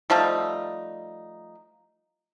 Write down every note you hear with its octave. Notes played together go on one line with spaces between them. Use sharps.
F3 G3 A3 D#4